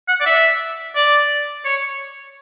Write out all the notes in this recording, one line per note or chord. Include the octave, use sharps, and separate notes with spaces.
F#5
D5
E5
D5
C#5